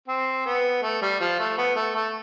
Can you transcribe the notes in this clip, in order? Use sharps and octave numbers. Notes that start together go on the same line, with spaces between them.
C4
B3
A3
G3
F3
A3
B3
A3
A3